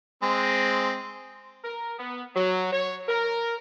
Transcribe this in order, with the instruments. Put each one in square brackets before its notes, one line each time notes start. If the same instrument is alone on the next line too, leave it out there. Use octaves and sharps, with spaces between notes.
[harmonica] G#3 C4
[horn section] A#4
B3
F#3
C#5
A#4